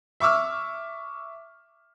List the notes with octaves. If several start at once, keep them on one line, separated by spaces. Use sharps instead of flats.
E5 C#6 D6 E6 F6